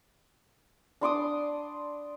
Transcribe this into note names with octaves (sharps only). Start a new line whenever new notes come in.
D4 C6 D6 D#6